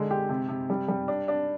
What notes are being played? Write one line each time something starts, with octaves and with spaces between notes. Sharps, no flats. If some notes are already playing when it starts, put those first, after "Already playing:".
Already playing: D3 G#3
G4
C3
C3
G3
G3
D4
D4